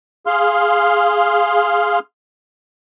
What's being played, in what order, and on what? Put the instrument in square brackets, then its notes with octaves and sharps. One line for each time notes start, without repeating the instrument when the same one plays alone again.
[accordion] G#4 F5 C6 F6